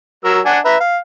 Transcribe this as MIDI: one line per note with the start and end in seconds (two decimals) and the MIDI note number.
0.24 0.40 54
0.24 0.40 70
0.24 0.40 88
0.45 0.59 62
0.45 0.59 78
0.45 0.59 80
0.65 0.76 71
0.65 0.76 76
0.65 0.76 82
0.80 0.98 77